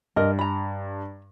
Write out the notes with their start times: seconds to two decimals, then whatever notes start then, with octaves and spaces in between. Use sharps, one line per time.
0.16 G2 A#4 D#5
0.39 A#5 B5